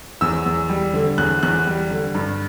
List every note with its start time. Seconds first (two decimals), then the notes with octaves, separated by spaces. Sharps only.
0.21 E2 E6
0.46 E2
0.69 G3
0.94 D3
1.18 E2 F#6
1.43 E2 F#6
1.67 G3
1.91 D3
2.15 G2